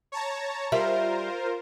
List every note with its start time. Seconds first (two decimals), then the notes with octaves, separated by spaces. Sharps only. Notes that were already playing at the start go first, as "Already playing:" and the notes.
0.12 C#5 A5 A#5
0.72 G3 F4 A#4 C5 E5